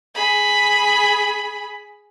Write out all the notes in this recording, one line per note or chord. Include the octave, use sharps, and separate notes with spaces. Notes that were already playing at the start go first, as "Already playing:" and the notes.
G#4 B5